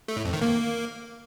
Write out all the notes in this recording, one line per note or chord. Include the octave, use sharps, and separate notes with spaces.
A3
A2
F2
D#3
A#3